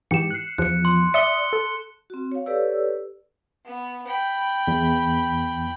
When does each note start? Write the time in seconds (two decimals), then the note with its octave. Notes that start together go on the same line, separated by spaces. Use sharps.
0.11 G#2 E3 G4 C#7 E7
0.30 F#6 C7
0.58 E2 F3 F#6 C#7
0.85 C6
1.14 D5 E5 D#6 C#7 G7
1.53 A4
2.10 C4 F#4
2.32 C#5 F5
2.46 G4 A4 B4 C#5 D5 E6
3.65 B3
4.07 G5 B5
4.68 E2